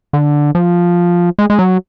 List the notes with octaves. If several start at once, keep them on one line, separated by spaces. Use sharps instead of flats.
D3
F3
G#3
G#3
F#3